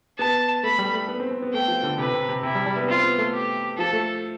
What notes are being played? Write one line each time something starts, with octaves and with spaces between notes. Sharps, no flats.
B3 A5
A3 B5
G3
A3
B3
C4
C4
B3
A3 G5
F3
D3
C3 B4
C3
C3
C3 E4
G3
G3
B3
C4 F4
B3
A3
G4
F3 A4
A3